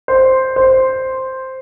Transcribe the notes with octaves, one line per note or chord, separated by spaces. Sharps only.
C5
C5